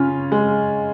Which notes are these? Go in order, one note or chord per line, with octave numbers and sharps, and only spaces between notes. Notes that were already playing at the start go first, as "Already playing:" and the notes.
Already playing: C#3 C#4 F4
G#3